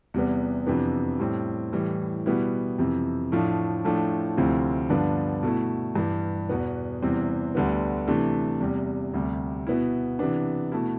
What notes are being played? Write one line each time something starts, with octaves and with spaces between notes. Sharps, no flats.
E2 C3 G3 B3
F2 C3 E3 B3 D4
A2 G3 C4
A2 E3 G3
B2 G3 B3 E4
F2 C3 E3
A2 F3 A3 D4
A2 F3 A3 D4
D2 C3 F3 C4 E4
G2 D3 F3 B3 D4
B2 A3 E4
G2 E3 G3
E2 B2 B3
E2 C3 E3 G3 C4
D2 D3 G3 B3
C3 E3 A3 D4
E2 C3 G3
D2 C3 G3
B2 B3 E4
C3 E3 B3 D4
B2 A3 E4